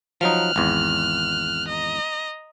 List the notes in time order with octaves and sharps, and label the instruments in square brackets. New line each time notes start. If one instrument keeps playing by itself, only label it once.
[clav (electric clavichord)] F3 F#3 D#4 [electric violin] F6 F#6
[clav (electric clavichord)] G#1 E2
[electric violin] D#5 A#5